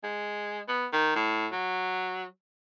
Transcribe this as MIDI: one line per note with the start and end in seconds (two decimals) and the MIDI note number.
0.04 0.60 56
0.68 0.86 59
0.93 1.13 51
1.16 1.47 45
1.52 2.25 54